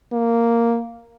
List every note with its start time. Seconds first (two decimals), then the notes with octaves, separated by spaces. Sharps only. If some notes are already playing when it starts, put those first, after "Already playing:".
0.13 A#3